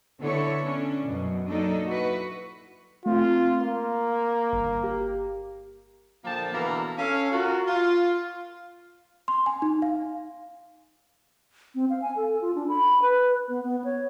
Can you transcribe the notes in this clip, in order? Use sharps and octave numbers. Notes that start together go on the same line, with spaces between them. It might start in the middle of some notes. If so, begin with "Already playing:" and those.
D3 B3 E4 A4 C#5
C#4 D4
F#2 B2
F#3 A#3 D4 D#4 A4 D#5
E4 F#4 B4
A3 C4 F4
A#3 C6
G1
G4
A#2 D3 F3 A#3 G5 A5
B2 D3 E3 A#3 A4 A#4
C#4 A4 F5
F4 F#4 A#4
F4
C6
G#5
D#4
F5
C4
F5
G#5
A4
F4
D4
B5
B4
B3
B3
C#5